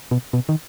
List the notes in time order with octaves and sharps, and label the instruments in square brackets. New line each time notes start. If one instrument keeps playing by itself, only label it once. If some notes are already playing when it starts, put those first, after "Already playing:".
[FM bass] B2
B2
D#3